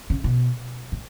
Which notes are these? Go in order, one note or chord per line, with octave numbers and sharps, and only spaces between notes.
C#3
B2
A2